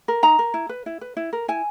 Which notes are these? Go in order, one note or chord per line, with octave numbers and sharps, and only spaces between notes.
A#4
D#4 A#5
A#4
E4
B4
E4
B4
E4
A#4
E4 G#5